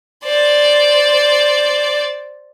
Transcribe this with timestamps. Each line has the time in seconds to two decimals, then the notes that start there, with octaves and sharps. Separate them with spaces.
0.24 C5 D5